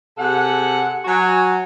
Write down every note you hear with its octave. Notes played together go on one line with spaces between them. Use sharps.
C3 G#4 A4 F#5
F#3 F#4 G#5